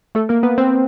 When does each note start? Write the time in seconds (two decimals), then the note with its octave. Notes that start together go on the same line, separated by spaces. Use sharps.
0.15 A3 A4
0.29 A#3 A#4
0.43 B3 B4
0.58 C4 C5